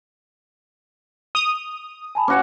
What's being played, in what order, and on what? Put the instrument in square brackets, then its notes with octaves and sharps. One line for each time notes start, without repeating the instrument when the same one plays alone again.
[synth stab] D#6 [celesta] F7 G7
[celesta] G#5 A5 B5
[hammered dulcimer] C#4 F#4 C#5 [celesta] D6 C#7